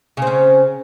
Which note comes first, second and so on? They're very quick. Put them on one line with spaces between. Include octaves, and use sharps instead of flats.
C#3 C4 C#4